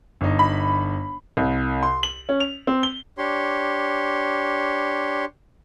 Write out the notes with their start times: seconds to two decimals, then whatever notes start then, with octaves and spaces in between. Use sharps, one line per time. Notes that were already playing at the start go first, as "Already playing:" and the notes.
0.21 G1 D#4
0.39 B5
1.37 C2
1.83 C6
2.03 F#7
2.29 C#4
2.40 F7
2.67 C4
2.83 G7
3.18 D4 G4 C#5 C6